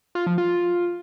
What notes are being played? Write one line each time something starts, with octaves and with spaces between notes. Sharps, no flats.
F4
F3
F4